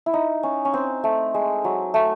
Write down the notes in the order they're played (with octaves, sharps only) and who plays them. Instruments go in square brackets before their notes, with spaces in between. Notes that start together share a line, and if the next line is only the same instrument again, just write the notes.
[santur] E4
D#4
C#4
C#4
C4
A3
G#3
F#3
A3